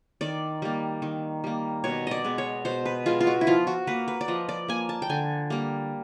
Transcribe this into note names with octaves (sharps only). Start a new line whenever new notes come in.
D#3 D5
G3 A#3
D#3
G3 A#3
B2 C#5
D5 D#5
G#3 B3
C#5
B2 C5
B4
G#3 B3 F4
F4
F#4
E4
F3 F4
F#4
A#3 B4
B4
D5
F3 D#5
D5
A#3 G#5
A5
G5
D3 G#5
G3 A#3